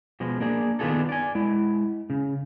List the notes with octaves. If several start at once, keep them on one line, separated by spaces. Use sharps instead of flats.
B2 F3 G#3
A#3 D4 G#4
D#3 B3 D4 F4 G#4 A4
D5 G#5
G#3 E4
C#3